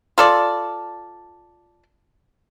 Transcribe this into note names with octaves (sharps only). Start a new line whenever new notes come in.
F4 A4 D5